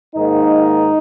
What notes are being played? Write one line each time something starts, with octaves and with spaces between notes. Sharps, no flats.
G#2 D#3 A#3 D#4